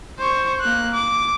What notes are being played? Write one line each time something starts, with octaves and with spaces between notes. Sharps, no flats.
C5 C#6
A#3 F#6
D6